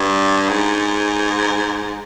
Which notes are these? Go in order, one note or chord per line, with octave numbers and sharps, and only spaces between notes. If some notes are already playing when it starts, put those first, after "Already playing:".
Already playing: G2
G#2